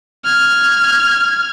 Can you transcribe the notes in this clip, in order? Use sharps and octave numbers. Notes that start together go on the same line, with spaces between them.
F6 G#6